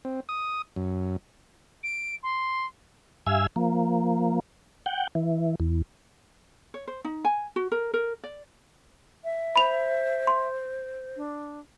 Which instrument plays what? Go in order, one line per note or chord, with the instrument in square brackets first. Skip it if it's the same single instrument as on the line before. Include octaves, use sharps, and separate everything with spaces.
[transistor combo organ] C4
D#6
F#2
[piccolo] D7
C6
[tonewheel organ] G2 E5 F5 G#5 E6
F3 A#3
F#5 G5
E3
E2
[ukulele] C#5
C5
D#4
G#5
F#4
A#4
A#4
D5
[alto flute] E5
[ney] C5 [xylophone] B5 F7
[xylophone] C6
[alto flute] D4